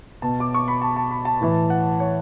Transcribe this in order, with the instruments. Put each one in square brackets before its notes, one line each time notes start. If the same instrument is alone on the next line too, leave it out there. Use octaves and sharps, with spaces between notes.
[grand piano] B2 A5
D6
C#6
B5
A5
A5
B5
A5
A2 E3
F#5
C#5